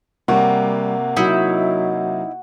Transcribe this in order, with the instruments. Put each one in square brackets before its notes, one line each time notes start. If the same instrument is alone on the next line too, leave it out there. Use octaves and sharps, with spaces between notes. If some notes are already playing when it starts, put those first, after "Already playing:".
[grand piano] C3 A#3 [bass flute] G3 [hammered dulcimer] F#4
[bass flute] F#3 [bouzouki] D#4 E4 E5